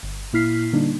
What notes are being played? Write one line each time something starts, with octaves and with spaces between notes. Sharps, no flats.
G1
A#2 A#3 E4 F6 B6 C7
D3 G3 A#3 D4 D#4